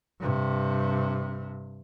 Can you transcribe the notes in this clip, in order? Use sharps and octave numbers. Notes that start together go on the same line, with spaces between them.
G2 C3